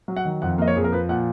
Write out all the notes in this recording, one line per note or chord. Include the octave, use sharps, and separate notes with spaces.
F#3
F#5
D#3
F2 F#5
A#3 D#5
C#5
F2 G#4
A#4
F3 B4
A#2 F#5